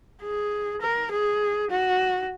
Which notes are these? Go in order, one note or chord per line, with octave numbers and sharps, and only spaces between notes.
G#4
A#4
G#4
F#4